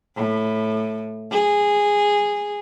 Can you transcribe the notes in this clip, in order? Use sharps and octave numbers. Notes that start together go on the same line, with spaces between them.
A2
G#4